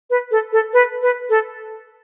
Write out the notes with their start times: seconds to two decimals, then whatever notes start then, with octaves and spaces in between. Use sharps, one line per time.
0.10 B4
0.31 A4
0.53 A4
0.73 B4
1.02 B4
1.30 A4